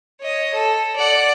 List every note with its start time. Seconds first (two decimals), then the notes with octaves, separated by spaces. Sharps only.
0.21 C#5 D#5
0.54 A4
0.96 D5 F#5